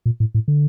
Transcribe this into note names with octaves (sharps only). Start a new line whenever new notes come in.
A#2
A2
A2
D3